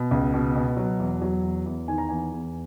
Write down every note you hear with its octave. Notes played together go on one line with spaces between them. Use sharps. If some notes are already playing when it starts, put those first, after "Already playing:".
Already playing: B2
C#2
B2
B2
F#3
E2
F#3
E2
E2
D#3 G#5
A#5
E2 G#5
E2